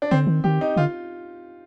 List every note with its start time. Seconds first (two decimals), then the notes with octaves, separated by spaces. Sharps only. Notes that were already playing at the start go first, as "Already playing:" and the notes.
0.02 D4
0.11 D3 C4
0.27 D#3
0.44 D#3 G4
0.61 D#4
0.76 D3 F4